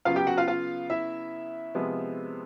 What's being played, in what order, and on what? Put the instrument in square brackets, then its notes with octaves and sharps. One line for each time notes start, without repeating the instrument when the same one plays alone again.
[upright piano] C#3 F#3 B3 F4 F5
G4 G5
F#4 F#5
F4 F5
F4 F5
E4 E5
C3 F3 G#3 B3